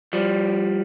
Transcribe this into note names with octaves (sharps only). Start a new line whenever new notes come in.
F3 G3